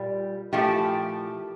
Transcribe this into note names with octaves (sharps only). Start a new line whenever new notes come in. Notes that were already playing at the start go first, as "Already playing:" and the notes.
Already playing: A#2 G3
A#2 F3 A3 E4 G4